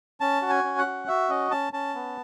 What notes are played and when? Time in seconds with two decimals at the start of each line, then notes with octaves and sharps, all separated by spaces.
0.21 C#4 A5
0.42 F#4
0.49 G#5
0.64 C#4
0.78 F#5
0.86 F#4
1.08 F#4 E5
1.29 C#4 D#5
1.51 C#4 A5
1.73 C#4 A5
1.95 B3